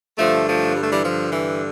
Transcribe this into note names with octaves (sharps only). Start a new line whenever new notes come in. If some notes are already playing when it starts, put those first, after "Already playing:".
G2 D3 F3 A3
F3 A3
G3
A3
E3 G3
F3
E3